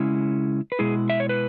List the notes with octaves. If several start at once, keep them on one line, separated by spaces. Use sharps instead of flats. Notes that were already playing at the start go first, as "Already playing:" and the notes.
Already playing: C#3 G#3 C#4 E4
B4
B2 G#3 E4 G#4
E5
C#5
B4